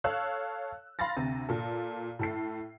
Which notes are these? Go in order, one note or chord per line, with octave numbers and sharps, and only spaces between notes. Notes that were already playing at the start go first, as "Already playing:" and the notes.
A4 C#5 F5 E6 F#6
F5 B5 C6 A6 A#6
D2 C3
A#2 A4
A2 A4 C7